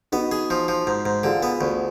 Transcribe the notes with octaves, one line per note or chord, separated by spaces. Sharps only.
B3 D#4 F#4
G#4
F3
F3
G#2
G#2
D3 F4 G#4
B3
D2